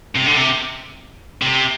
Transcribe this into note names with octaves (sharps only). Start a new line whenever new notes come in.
C3
D3
C3
C3